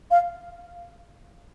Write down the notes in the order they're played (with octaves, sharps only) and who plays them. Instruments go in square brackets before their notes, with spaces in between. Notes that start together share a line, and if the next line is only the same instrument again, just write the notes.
[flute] F5